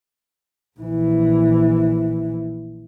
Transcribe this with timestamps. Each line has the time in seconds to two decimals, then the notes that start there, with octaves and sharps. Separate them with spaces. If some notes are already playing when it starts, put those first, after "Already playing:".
0.78 A#1 E3